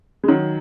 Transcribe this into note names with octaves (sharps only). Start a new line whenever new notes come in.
G#3
D#3 F#3